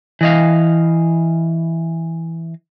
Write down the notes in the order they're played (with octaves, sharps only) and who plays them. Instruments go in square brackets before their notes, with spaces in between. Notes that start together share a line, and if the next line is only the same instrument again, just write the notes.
[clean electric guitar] E3 D#5 F5